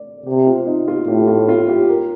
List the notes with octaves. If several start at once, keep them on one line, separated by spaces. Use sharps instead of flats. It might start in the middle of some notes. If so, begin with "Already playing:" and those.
Already playing: D5
C3 G4
F4
D#4
F4
A2 G4
F4
F4
G4
A#4